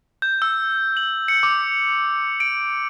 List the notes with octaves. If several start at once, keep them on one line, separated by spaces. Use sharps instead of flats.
G6
E6
F#7
C#7
D6
D7